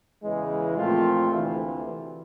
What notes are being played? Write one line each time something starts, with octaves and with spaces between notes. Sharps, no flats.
E2 C#3 E3 G#3
A#2 F3 A3 C4 F4
D2 C3 E3